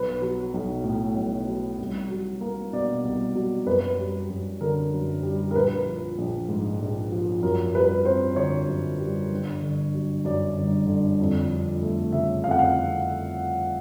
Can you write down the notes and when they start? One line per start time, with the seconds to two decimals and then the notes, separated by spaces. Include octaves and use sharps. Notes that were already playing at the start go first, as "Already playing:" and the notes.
Already playing: B1 B4
0.22 F#3
0.54 B1
0.84 A2
1.17 B1
1.47 F#3
1.78 C2
2.10 F#3
2.41 A#3
2.73 B2 D5
3.05 C2
3.35 F#3
3.66 F#2 B4
3.99 G3
4.30 F#2
4.61 D3 A#4
4.93 F#2
5.23 G3
5.51 A#4
5.54 A#1 B4
5.86 F3
6.18 A#1
6.49 G#2
6.80 A#1
7.12 F3
7.42 F#2 A#4
7.75 G3 B4
8.05 C4 C5
8.36 D3 C#5
8.68 F#2
8.99 G3
9.32 G1
9.62 D3
9.94 F#3
10.25 F#2 D5
10.56 G1
10.87 D3
11.20 F2
11.50 F3
11.82 A3
12.12 C#3 E5
12.44 F2 F5
12.51 F#5
12.59 F5